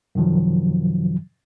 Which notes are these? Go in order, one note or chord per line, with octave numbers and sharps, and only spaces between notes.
F#2 C3 D#3 F3 F#3